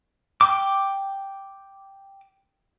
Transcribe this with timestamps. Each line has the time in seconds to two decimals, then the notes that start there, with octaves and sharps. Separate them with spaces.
0.41 G5 D6